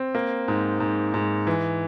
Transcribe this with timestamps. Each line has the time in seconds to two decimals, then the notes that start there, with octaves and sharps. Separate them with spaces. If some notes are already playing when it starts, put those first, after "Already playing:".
Already playing: C4
0.15 A#3
0.48 G#2
0.80 G#2
1.14 G#2
1.47 E3